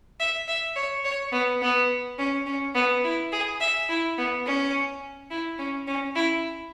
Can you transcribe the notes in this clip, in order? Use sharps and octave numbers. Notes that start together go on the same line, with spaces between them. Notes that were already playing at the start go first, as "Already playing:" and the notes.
E5
E5
C#5
C#5
B3
B3
C#4
C#4
B3
E4
G#4
E5
E4
B3
C#4
E4
C#4
C#4
E4